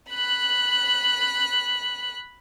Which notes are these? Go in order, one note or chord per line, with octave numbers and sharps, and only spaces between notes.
B5 F#6